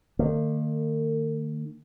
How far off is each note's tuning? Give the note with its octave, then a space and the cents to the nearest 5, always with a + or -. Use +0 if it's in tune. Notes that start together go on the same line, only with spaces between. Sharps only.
D#3 -45 A#3 -45